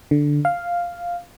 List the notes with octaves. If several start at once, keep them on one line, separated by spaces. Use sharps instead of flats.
D3
F5